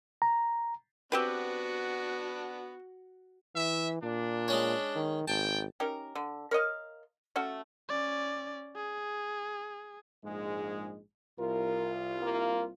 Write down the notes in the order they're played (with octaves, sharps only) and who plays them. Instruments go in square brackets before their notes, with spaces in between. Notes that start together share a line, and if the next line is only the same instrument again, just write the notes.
[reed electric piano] A#5
[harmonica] B3 D4 [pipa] C4 G4 B4 [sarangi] F#4
[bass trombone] E3 [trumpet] E5
[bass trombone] A#2 [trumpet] D4
[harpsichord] G#3 C#4 C#5
[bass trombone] D#3
[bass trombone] G#1 [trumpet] G5 [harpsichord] A5
[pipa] C#4 D#4 G4 A#4
D3
A#4 C#5 D#5 F5
A3 C#4 F#4 A4
[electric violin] C#4 D5
G#4
[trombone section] A#1 G#2 G#3
[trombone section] C2 F4 [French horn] A#4
[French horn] A#3